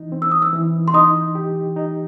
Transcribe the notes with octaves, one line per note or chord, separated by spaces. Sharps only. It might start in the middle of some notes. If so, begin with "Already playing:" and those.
Already playing: E3 D#4
C4
E6
D#6
E6
E3
C6
D#4 D#6
G4
D#4